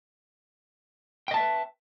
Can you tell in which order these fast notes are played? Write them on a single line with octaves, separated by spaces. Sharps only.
G5 D#5 A5 E5 B4